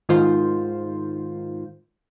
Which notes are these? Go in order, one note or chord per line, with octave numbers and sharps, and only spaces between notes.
G#2 D#3 F4 C5